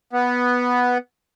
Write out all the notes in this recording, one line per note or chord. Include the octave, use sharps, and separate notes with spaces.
B3